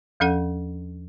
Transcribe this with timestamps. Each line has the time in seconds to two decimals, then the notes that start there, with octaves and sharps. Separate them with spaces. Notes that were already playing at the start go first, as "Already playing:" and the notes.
0.20 E2 F3 C#4 A4 F#5